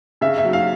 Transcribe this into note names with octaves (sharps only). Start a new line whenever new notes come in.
C#3 E5
E5
F#3
F5